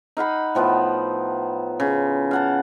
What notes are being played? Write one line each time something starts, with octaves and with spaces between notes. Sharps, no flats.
D#4 F5 F#5 B5
A2 F3 B3
C#3
F5 F#5 A5